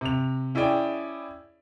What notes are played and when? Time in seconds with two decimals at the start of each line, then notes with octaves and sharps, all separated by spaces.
0.01 C3 F7
0.55 C#4 E4 G#4 D5 G5